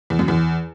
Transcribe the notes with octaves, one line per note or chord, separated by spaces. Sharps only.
E2
F#2
E2